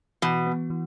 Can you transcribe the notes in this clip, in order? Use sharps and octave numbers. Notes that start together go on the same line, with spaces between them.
B2 E3
B3
E3